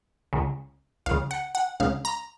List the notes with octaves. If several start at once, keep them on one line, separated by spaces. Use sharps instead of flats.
C#2 C#3
C#2 C#3 F5
F#5
F#5
C#2 C#3 F5
A#5